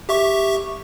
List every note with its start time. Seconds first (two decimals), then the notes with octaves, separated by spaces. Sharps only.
0.09 G4 E5 C#6